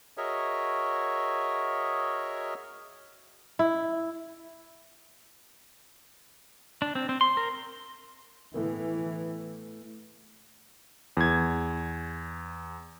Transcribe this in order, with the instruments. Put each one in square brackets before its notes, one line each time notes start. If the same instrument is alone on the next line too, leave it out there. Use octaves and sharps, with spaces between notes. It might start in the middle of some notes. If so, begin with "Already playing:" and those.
[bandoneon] F#4 G#4 A#4 C#5 D#5 E5
[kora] E4
[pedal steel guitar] D4
C4
C4
C6
A#4
[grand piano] A2 A3 B3 [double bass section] E3
[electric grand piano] E2 G#6